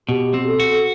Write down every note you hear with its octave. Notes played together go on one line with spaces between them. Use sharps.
B2 G4
C4
A4
F#4